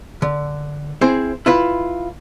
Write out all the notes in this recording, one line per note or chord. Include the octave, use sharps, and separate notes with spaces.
D3
C4 E4 G#4 C5
E4 F4 B4